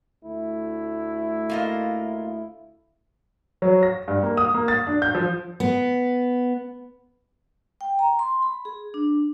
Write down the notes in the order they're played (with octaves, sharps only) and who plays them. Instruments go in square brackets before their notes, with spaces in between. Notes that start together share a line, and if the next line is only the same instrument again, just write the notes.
[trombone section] D2 A3 E4
[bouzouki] A#3 F4 D#5
[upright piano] F#3
A#6
G2
A#3
D#6
A#3
A6
D4
G6
F3
[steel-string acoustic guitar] B3
[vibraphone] G5
A#5
C6
B5
G#4
D4